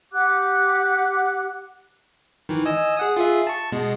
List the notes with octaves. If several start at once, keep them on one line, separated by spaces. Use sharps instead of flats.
G4 F#5 D6 F#6
D#3 E3
D#5 G#5 E6
G#4 F#5 D#6
F4 G#4 E5
A5 C#6
B2 G#3